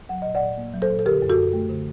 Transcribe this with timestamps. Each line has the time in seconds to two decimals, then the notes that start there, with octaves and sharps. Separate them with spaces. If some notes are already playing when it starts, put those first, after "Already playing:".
0.09 F#3 F#5
0.22 A#2 D#5
0.35 D5 F#5
0.42 A#2
0.57 A#3
0.74 F#3
0.82 A4 C5
0.90 A#2
0.99 A4
1.05 D3 G4 A#4
1.22 F#2
1.30 F#4 A4
1.37 F#2
1.53 A3
1.69 D3